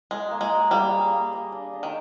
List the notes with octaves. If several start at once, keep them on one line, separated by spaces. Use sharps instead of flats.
G#3 D#5
A#3
G#3
D#5
G3 A#3
G#4
A#3
D#5
D4
D4
D#3